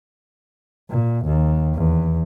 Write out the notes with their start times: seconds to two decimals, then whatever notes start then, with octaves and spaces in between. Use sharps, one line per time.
0.90 A#2
1.26 D#2
1.75 E2